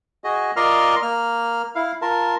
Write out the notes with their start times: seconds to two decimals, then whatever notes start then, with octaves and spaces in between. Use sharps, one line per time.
0.24 F#4 G#4 D#5
0.56 F4 A#4 D5 D#5 C6 F6
1.02 A#3 F6
1.75 E4 F5
2.02 F4 A#4 A5